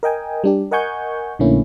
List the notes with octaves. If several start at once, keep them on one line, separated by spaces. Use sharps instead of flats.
A#4 D#5 G5 G#5
G3 D4 G4
A#4 D#5 F#5 G#5 C#6 G6
A#1 D3 A3 A#3 C#4 E4